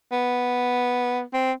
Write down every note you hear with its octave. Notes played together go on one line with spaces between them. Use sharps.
B3
C4